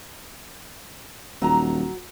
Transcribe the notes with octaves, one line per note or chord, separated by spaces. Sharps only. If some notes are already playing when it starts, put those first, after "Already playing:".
D#1 F#3 A#5